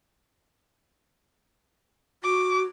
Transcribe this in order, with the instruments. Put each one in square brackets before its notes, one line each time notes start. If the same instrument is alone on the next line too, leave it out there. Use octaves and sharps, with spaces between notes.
[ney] F#4 [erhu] D6